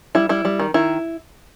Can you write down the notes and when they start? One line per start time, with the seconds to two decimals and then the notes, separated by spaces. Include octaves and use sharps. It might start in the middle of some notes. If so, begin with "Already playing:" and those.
0.15 G3 E4
0.29 G3 E4
0.45 G3
0.59 D#3
0.74 D#3 E4